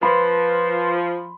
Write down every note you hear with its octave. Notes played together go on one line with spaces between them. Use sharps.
F3 B4 B5 C6